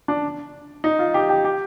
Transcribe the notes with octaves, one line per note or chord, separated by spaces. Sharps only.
D4
D#4
F4
G4
G4
G4